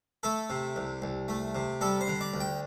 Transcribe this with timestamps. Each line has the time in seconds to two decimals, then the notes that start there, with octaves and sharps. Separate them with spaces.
0.23 A3 A4
0.50 C3
0.76 C2
1.02 C2
1.28 A3
1.55 C3
1.81 G3 A4
2.01 C5
2.07 D3
2.21 D5
2.34 D2
2.40 G5